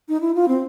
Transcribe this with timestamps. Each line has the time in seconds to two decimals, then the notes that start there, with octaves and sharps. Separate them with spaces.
0.09 D#4
0.21 E4
0.35 F4
0.48 C4